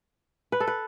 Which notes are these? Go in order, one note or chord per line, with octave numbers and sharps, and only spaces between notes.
B4
A4
B4